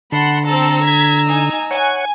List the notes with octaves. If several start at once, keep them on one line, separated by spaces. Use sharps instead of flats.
D3 F#5 A5 B5 C6
C4 A4 A#5 E6
G#6 B6
D#4 G#5
C#5 F#5 G#5